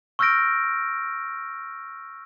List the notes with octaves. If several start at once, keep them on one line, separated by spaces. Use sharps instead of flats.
C#6 E6 F6 G6 A#6 D7